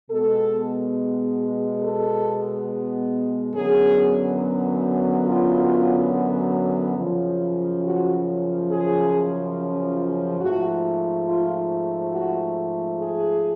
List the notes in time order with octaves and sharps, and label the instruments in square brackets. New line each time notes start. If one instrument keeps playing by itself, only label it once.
[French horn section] B2 G#3 B3 A4
A4
F#2 D3 F#3 B3 G#4
F4
F#2 C#3 F3
F#4
G#4
G#2 F3 A3 F#4
F4
F#4
G#4